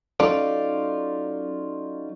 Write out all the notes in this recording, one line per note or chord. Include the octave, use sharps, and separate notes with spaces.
F#3 C#4 D#4 F4 A4 D5